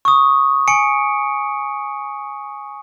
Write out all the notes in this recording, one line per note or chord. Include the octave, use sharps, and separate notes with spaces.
C#6 D#6
G#5 C#7 D7